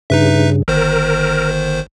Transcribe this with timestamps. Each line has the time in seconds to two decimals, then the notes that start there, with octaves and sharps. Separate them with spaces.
0.10 G2 C#3 D#4 B4 E5
0.68 G1 D#3 A#4 C5